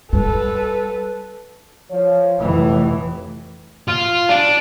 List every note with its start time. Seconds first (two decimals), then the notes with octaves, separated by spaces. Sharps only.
0.13 G3 A4 B4
1.91 F3 C#5
2.40 F1 A2 E3
3.88 F4
4.29 D4